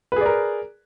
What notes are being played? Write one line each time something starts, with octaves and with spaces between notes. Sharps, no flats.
G#4 A#4 B4 D5